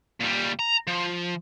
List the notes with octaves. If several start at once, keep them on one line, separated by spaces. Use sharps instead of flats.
A#2 G3
A#5
F3